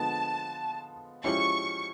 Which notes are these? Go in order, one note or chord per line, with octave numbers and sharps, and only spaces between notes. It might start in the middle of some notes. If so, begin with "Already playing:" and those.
Already playing: D3 F3 G#3 B3 A5
F3 G#3 C#4 E4 G4 C#6